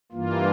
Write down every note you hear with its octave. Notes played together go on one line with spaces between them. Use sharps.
G2 E3 A#3 F4